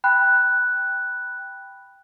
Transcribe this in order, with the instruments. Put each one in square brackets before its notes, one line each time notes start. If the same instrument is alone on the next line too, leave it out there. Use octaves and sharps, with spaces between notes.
[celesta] G5 B5 F#6